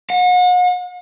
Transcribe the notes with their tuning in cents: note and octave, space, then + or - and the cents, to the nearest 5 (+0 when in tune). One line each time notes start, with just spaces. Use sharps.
F#5 -40